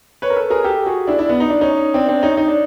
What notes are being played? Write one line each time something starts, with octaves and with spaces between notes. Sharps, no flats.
B4 C#5
A#4
A4 B4
G#4 A#4
G4 A4
F#4 G#4
D4 E4
D4 E4
B3
D#4
D4
C#4 D#4
C4 D4
C4 D4
C#4 D#4
D#4
D4